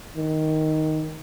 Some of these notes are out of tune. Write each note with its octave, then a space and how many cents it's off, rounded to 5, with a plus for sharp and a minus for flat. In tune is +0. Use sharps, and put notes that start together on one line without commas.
D#3 +5